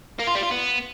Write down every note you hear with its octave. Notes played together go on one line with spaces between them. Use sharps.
A#3
F4
G3
F4
B3